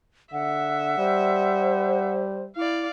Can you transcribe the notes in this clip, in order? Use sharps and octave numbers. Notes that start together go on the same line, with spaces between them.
D3 E5 F#5
G3 C5
E4 D5 F5